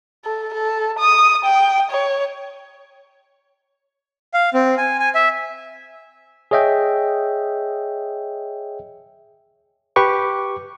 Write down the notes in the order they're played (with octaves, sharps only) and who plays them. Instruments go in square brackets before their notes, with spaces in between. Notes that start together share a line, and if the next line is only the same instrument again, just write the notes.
[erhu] A4
A4
D#6
G5
C#5
[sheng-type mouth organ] F5
C4
G#5
G#5
E5
[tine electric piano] G#4 C#5 D#5 E5 G5
[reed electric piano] G4 B4 C#6 D6